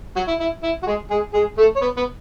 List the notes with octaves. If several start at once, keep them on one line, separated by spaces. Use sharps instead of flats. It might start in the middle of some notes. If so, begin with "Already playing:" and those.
F#3 F#4
E4
E4
E4
F#4
G#3 G#4
G#3 G#4
G#3 G#4
A3 A4
C#5
B3 B4
B3 B4